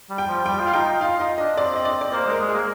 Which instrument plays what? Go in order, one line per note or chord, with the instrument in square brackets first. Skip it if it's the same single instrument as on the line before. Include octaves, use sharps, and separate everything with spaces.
[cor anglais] G3
[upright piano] G5
[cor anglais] F3
[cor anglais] G3 [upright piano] G5
[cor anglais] F4
[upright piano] F5
[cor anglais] D#4 [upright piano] G5
[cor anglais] D#4
[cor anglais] F4 [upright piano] F5
[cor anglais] D#4 [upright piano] D#5
[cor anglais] D4 [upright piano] D#5
[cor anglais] C4 [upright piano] D5
[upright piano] D#5
D5
D5
[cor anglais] A#3 [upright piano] C5
[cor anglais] G#3 [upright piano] A#4
[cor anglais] G#3
[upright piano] G#4
[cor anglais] A#3